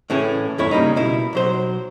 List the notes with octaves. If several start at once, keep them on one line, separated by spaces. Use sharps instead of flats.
A2 E3 C#4 G#4
E2 G2 E4 C#5
C#3 G3 A#3 D#4
B2 E4
B1 F#3 C5